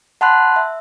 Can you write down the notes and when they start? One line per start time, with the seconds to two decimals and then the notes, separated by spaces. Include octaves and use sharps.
0.21 F#5 A5 B5 C6 F#6
0.56 E5